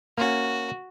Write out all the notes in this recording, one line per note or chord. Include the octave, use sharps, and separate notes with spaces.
A#3 C#4 F#4